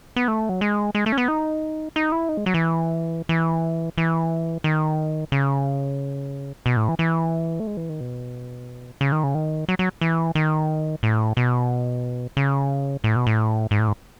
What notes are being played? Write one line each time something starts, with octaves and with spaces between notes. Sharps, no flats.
B3
A3
F#3
G#3
G#3
A3
C#4
B3
D#4
D#4
E4
D#4
G#3
F#3
E3
E3
E3
D#3
C#3
B2
A2
E3
E3
A3
G#3
E3
D#3
B2
C#3
D#3
C#3
D#3
F#3
F#3
E3
D#3
A2
B2
C#3
A2
B2
A2
G#2
A2
G#2